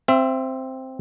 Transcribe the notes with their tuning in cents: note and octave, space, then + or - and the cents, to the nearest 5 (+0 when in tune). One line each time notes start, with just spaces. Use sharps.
C4 +0 E5 +30